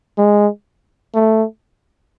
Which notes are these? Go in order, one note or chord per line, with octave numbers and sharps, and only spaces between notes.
G#3
A3